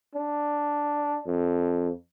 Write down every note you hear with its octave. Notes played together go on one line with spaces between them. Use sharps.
D4
F2